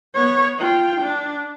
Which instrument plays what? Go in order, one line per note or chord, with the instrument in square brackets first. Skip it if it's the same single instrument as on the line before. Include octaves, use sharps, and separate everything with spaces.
[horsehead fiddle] B3 C#5
F4 G5
D4